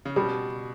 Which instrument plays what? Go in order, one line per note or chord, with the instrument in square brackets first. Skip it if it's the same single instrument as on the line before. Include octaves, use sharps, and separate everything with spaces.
[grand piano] C#3
[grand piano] B2 [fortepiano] G3